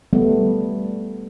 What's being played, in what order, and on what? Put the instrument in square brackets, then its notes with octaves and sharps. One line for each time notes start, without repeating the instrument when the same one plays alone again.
[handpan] G3 A3 B3